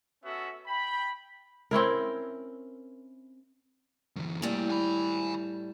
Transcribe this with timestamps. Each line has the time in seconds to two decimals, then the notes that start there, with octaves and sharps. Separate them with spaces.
0.24 B3 C#4 F#4 A4 E5
0.68 G5 B5
1.71 C4 C#4 E4 A#4
4.16 F#2 E3
4.42 A2 G3 A#3 G#5
4.70 G#5 B5